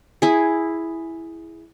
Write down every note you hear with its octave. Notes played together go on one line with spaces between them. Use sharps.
E4 G#4